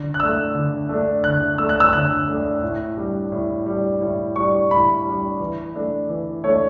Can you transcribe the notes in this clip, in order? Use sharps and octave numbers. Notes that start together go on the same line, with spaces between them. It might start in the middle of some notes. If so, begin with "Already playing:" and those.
Already playing: D3
F#6
A3 D4 E6
D3
A3 D4
D3 F#6
A3 D4 E6
F#6
E6
D3 F#6
A3 D4
A2
G3 D4
A2
G3 D4
A2
G3 D4 C#6
A2 B5
G3 D4
E3
A3 D4
E3
A3 D4 C#5